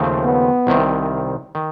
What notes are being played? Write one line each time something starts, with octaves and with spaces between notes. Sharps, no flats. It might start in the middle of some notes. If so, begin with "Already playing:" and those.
Already playing: D#2 C#3 F3 A3 C4
B3
C2 C3 D#3
D#3